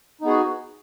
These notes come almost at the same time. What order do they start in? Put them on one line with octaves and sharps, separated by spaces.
D#4 B3 G#4 F#4